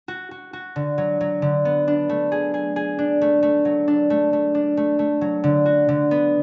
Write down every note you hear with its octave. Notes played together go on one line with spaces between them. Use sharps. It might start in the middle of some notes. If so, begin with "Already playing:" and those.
F#4
F#4
F#4
D3
F#3
F#3
D3
B3
D4
A3
G#4
G#4
G#4
D4
A3
A3
F#3
D4
A3
A3
D4
A3
A3
F#3
D3
F#4
D3
B3